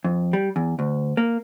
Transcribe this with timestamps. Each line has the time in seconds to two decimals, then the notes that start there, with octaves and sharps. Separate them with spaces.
0.04 F2
0.33 G3
0.56 E2
0.79 D2
1.17 A#3